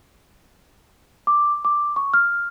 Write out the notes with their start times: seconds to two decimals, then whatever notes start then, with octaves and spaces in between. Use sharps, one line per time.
1.27 D6
1.65 D6
1.96 C#6
2.14 F6